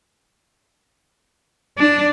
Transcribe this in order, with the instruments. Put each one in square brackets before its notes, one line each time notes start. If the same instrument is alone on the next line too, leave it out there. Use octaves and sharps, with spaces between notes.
[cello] D4